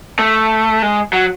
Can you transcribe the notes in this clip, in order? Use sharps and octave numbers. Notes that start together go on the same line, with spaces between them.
A3
G#3
F#3